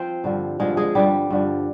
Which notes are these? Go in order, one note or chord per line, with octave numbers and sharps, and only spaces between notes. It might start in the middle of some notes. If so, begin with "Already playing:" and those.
Already playing: F3 C4 C5
G2 D3 F3
G2 D3 F3 G#3 G#4
G#3 G#4
G2 D3 F3 G3 G4
G2 D3 F3